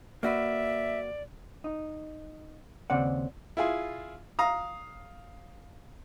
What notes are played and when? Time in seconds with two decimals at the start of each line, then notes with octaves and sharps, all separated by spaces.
0.23 A#3 F#4 B4 D5 E5
1.64 D#4
2.90 D#2 C#3 C4 D5 F#5
3.57 E4 F4 G#4
4.39 F5 A#5 D#6